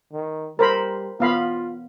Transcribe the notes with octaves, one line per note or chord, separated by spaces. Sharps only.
D#3
G3 A#4 C5 B5
B3 F4 F5 B5